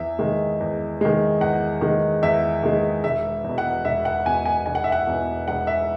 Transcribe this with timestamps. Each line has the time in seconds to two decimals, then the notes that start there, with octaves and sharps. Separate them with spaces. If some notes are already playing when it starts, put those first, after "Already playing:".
Already playing: E2 E5
0.19 D#3 G#3
0.60 E2
1.01 D#3 G#3
1.41 E2 F#5
1.81 D#3 G#3
2.23 E2 E5
2.63 D#3 G#3
3.04 E1 E5
3.44 E2
3.49 B2
3.58 F#5
3.85 E1 E5
4.05 F#5
4.25 E2 B2 G#5
4.45 G#5
4.66 E1 G#5
4.75 F#5
4.84 E5
4.92 F#5
5.07 E2 B2
5.48 E1 F#5
5.67 E5